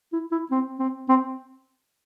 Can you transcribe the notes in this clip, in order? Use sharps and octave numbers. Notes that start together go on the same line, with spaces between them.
E4
E4
C4
C4
C4